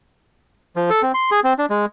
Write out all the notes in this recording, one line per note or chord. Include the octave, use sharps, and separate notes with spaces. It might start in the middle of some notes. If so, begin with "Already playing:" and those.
F3
A4
C4
C6
G#4
C4
D4
G#3